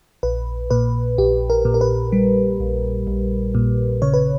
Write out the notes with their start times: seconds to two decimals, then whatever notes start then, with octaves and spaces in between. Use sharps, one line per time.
0.23 A#1 B4
0.71 A#2 B4
1.18 A#1 G4
1.50 A#4
1.65 A#2
1.74 A#4
1.81 B4
2.12 G3
2.60 A#1
3.07 A#1
3.55 A#2
4.02 C#3 C#5
4.14 B4